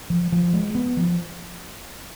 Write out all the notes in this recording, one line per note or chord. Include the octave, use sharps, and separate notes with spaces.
F3
F3
G#3
B3
F3